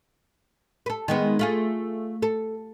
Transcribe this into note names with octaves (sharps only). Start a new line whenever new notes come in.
A4 B4
D#3 G#3 B3
A3 F4 G#4
A4